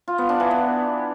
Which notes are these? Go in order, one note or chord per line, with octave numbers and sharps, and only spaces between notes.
F4
B3
D4
E3
B3